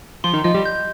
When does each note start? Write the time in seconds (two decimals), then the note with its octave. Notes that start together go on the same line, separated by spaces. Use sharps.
0.24 F3 F4 C6
0.34 D#3 D#4
0.44 F3 F4 D#5
0.54 G3 G4
0.65 G6